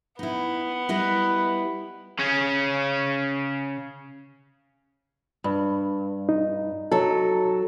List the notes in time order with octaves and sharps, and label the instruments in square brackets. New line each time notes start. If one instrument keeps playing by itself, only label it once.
[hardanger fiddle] B3 [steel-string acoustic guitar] D#4 E4
[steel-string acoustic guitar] G3 E4 D#5 [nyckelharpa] B4
[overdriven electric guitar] C#3 C#4
[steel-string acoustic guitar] G2
[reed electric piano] D#4
[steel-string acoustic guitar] F#3 A4